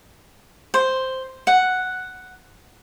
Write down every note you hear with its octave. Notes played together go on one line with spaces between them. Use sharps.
C5
F#5